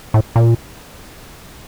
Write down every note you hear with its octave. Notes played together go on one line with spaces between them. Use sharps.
A2
A#2